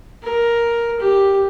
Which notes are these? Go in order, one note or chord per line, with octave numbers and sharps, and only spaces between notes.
A#4
G4